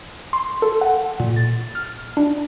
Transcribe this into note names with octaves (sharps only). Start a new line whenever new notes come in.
C6
A4
F#5
A#2
A6
F6
D4